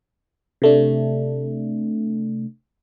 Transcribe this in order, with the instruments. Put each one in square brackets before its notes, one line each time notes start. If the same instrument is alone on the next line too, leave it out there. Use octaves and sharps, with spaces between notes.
[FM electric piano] C3 A3 D4